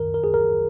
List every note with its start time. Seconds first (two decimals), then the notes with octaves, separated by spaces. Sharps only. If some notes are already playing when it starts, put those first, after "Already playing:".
Already playing: F#2 D#3 A#4
0.14 A#4
0.24 G#4
0.34 A#4